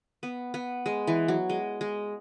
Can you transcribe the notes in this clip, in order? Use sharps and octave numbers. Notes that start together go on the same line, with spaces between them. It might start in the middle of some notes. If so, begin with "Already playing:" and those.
B3
B3
G#3
E3
F#3
G#3
G#3